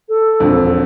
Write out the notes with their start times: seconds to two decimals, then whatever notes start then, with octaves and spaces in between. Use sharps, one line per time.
0.09 A4
0.40 E1 A#1 F2